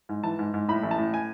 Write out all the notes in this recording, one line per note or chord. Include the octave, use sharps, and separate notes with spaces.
G#2
E3 A5
G#2
G#2
A2 B5
A1
A5
A2
G#5